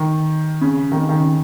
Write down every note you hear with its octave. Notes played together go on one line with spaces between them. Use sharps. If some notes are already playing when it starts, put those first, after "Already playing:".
Already playing: D#3
C#3
D#3
C#3
D#3
C#3